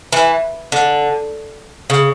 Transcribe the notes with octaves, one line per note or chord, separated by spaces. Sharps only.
E3
D3
C#3